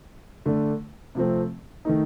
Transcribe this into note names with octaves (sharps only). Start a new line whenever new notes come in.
D3 A3 D4
C3 F3 A3 C4
D#3 A3 D#4